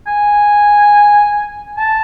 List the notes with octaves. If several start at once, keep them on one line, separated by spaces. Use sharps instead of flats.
G#5
A5